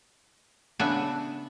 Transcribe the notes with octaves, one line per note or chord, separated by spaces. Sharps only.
C#3 B3 D4 E5 G#5